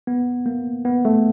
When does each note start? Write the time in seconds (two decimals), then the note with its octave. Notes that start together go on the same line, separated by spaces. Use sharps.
0.07 B3
0.46 A#3
0.85 B3
1.05 A3